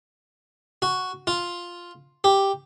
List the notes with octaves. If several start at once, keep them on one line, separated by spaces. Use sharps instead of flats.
F#4
F4
G4